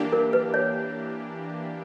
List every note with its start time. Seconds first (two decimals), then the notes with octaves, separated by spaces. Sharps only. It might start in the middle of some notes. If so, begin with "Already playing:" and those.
Already playing: E3 A#3 D4 G4
0.13 A#4
0.33 B4
0.54 C#5